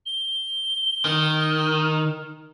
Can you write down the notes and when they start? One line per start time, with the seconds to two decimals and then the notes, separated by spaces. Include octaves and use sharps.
0.05 G7
1.05 D#3